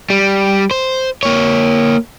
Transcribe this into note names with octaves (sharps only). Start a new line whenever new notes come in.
G3
C5
A#3 C#5